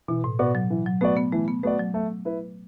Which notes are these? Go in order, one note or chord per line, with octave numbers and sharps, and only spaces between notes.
B2 E3
A2
B2 B3 F#4 D5
F#3
E3
F#3
A3 B3 F#4 D5
B3
E3 A3
B3
A3 B3 F#4 D5
F#3
A3
E4 B4